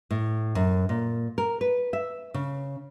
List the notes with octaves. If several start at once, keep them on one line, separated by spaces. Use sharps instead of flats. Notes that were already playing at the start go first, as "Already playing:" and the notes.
A2
F#2
A#2
A#4
B4
E5
C#3